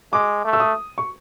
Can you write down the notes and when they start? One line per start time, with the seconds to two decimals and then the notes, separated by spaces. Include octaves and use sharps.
0.13 G#3 D6
0.45 A3
0.53 E6
0.60 D#6
0.98 C#6